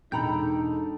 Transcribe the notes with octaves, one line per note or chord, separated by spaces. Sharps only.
E1 D4 D#4 A4 G5 A#5 B5 G6